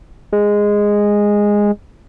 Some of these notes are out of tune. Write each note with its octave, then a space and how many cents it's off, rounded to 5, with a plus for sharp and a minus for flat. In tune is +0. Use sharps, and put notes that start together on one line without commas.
G#3 -10